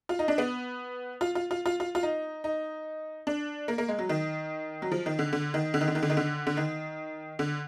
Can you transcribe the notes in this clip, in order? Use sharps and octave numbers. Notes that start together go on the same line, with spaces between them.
F4
D#4
D4
B3
F4
F4
F4
F4
F4
F4
D#4
D#4
D4
A#3
A#3
G#3
F#3
D#3
F#3
F3
D#3
D3
D3
D#3
D3
D#3
D3
D#3
D3
D#3
D3
D3
D#3
D3